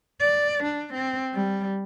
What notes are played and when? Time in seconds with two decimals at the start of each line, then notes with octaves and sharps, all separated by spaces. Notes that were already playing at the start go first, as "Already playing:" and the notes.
0.21 D5
0.64 D4
0.94 C4
1.34 G3